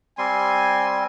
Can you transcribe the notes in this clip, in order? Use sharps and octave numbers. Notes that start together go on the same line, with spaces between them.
G3 C4 G#5 C6